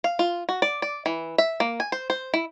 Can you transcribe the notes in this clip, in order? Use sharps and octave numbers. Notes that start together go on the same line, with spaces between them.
F5
F4
F#4
D5
D5
E3
E5
A#3
G#5
C5
C5
E4